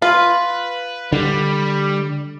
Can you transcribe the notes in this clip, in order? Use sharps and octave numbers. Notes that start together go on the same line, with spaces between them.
F4 B4
D3 G3